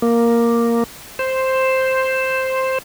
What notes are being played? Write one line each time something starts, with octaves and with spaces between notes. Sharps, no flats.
A#3
C5